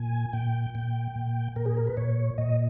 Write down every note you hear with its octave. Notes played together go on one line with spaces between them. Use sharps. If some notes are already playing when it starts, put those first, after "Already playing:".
Already playing: A#2 G#5
A#2 G5
A#2 G5
A#2
A#2 A#4
G#4
A#4
B4
A#2 C#5
A#2 D#5